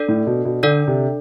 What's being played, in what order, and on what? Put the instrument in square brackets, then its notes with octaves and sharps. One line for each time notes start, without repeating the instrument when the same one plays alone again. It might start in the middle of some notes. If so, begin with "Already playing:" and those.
Already playing: [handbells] D4 A4 D5
[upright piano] A2
B2
B2
[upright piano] D3 [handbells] D4 A4 D5
[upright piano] C3